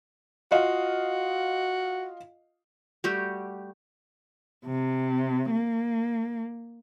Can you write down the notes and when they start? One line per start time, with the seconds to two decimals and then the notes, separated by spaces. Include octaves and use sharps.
0.52 F4 F#4 D#5 F5
3.04 G3 A3 F#4 G4
4.66 C3
5.51 A#3